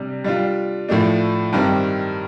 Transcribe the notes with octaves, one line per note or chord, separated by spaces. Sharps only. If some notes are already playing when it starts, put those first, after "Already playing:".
Already playing: C3 G3 D4
G3 D4 F4
A2 F3 A3 D4
G2 D#3 G3 C4